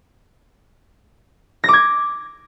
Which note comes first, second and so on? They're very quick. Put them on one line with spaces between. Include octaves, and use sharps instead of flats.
A#6 D6 G#6